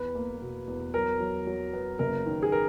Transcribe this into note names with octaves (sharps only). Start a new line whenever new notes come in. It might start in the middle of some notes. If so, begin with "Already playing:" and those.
Already playing: E2 B4
A#3
B2
E2
F#3 A#4
F#3
F#3
B3
F#1 A#4
D#3
G#4
A#4